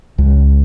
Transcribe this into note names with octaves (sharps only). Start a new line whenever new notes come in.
C#2